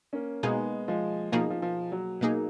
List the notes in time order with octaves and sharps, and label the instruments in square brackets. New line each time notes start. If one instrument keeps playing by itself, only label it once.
[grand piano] A#3 C#4
[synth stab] B2 A#3 D#4 G#4 [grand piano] G#3 B3
[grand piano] F3 G#3
[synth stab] B2 A#3 D#4 G#4 [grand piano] F3
[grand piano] F3
F3
F#3
[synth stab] B2 A#3 D#4 G#4